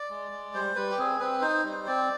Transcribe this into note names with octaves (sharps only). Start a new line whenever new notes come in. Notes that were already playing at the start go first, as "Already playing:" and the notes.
Already playing: D5
G#3
G#3
G3 C5
G3 B4
G4
C4 G#4
C4 B4
D#4 C5
G3
C4 D5